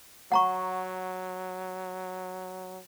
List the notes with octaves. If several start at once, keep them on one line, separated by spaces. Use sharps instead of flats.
F#3 F#5 A#5 C#6